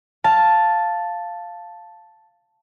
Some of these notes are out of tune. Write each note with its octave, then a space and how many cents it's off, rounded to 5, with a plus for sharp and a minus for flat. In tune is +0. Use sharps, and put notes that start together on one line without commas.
F5 +0 A5 +0